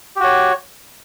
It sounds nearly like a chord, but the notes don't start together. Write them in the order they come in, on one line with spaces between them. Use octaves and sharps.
G4 F#4 C#5